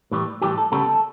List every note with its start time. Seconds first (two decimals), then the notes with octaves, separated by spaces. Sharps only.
0.12 A2 E3 G3
0.42 A2 E3 G3 G4
0.58 A4
0.72 D2 C#3 G3 B3 A4